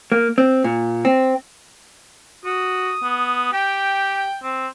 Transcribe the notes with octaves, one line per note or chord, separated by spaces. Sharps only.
A#3
C4
A#2
C4
F#4 D#6
B3
G4 G5
C4